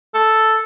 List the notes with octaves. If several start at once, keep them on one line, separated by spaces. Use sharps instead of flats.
A4